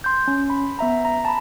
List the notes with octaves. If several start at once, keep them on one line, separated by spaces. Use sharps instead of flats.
C6 G6
C#4
B5
B3 E5 A#5
A#5
A5 B5